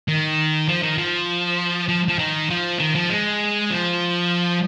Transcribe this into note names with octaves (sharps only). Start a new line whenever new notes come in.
D#3
F3
D#3
F3
F3
F3
D#3
F3
D#3
F3
G#3
F3